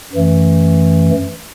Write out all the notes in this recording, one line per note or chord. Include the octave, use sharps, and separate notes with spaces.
F#2 E3 A3